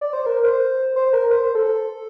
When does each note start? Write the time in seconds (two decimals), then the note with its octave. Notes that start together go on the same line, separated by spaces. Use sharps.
0.01 D5
0.13 C5
0.26 A#4
0.44 C5
0.96 C5
1.13 A#4
1.31 C5
1.43 C5
1.55 A4
1.66 A4